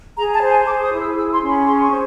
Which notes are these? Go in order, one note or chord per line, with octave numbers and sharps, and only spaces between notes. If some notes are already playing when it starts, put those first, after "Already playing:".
G#4 A#5
A5
C5
G#5
G#4 D6
D#6
E4
E6
G#4 E6
C6
C#4
B5
G#4 C6
C#6
C5